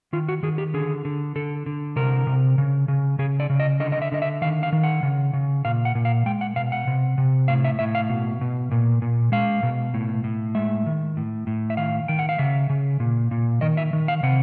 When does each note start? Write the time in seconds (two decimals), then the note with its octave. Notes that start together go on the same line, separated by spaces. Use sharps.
0.13 D#3 F4
0.29 F#4
0.43 D#3 G#4
0.58 G4
0.74 D3 G#4
1.05 D3
1.36 D3 A4
1.66 D3
1.96 C3 A#4
2.27 C3
2.58 C#3
2.88 C#3
3.19 C#3 G#4
3.40 D5
3.50 C#3
3.60 D#5
3.80 D3 D#5
3.92 D#5
4.02 E5
4.12 D3 D#5
4.22 E5
4.42 D#3 F5
4.63 F5
4.73 D#3
4.83 F#5
5.03 C#3
5.33 C#3
5.65 A#2 F5
5.85 F#5
5.95 A#2
6.05 F5
6.26 G#3 G5
6.41 F#5
6.56 B2 F5
6.72 F#5
6.87 C3
7.18 C3
7.48 A2 F5
7.64 E5
7.79 A2 E5
7.95 F5
8.09 B2
8.41 B2
8.71 A#2
9.02 A#2
9.32 G#3 F5
9.63 B2
9.94 A2
10.24 A2
10.55 G#3 E5
10.86 D#3
11.17 A2
11.47 A2
11.70 E5
11.77 D#3 F5
12.08 D#3 G5
12.19 F#5
12.29 F5
12.39 C#3 E5
12.70 C#3
13.00 A#2
13.31 A#2
13.61 D#3 D#5
13.77 E5
13.93 D#3
14.08 F5
14.23 C3 F#5